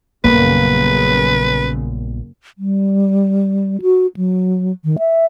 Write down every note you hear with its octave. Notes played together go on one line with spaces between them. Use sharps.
A#1 F#2 C#3 G3 A#3 B3 B4
G3
F#4
F#3
D#3
E5